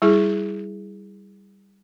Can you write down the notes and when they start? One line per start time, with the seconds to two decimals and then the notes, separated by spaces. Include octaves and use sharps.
0.02 G3 E4 G#4